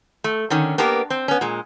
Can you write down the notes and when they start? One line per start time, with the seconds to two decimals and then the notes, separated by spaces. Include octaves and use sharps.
0.24 A3
0.50 D3 D#3 C#4
0.78 A#3 B3 D4 G4 A#4
1.10 C4
1.28 B3 C#4
1.41 A#2 G#3